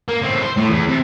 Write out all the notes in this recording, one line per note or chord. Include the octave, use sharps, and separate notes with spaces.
A#3
A2 C4
C5
A2
E2
C3